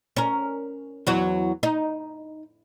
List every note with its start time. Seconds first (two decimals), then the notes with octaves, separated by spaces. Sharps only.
0.16 C#4 A#4
1.07 E2 F#3 F#4
1.63 D#4